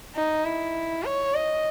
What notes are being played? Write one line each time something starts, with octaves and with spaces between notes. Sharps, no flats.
D#4
E4
C#5
D#5